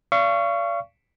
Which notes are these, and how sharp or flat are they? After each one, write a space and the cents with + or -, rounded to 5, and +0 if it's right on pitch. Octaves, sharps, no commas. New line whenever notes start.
D5 -30 F5 -35 C#6 +5